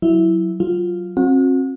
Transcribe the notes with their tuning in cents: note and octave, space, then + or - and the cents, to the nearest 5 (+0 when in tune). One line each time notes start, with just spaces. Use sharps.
F#3 -5 E4 +0
F#3 +15 F4 +0
C4 +35 F#4 -35